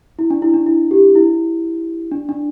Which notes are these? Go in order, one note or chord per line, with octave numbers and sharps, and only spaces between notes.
E4
D4
E4
D4
E4
G4
E4
D4
D4